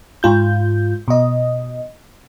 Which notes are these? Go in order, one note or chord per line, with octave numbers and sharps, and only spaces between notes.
G#2 F4 G6
B2 D#5